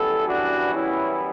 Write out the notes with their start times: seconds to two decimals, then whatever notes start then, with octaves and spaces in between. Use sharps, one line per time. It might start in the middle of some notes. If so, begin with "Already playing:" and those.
Already playing: F#2 E3 G3 B3 A4
0.27 D4 F#4
0.73 C#4 E4